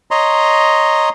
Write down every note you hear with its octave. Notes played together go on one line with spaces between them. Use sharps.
C#5 D#5 A#5 C6